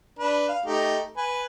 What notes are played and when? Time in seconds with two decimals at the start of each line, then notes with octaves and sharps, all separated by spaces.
0.19 D4 B4
0.48 F5
0.66 A3 D#4 G4
1.17 B4 G#5